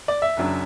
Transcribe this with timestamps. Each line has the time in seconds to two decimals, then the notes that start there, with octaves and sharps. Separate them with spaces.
0.08 D5
0.22 E5
0.37 F#1 F#2 F#3 D4